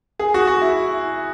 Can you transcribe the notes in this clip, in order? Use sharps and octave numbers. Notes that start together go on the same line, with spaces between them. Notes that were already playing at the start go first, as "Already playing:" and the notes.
G#4
F#4
F#4
E4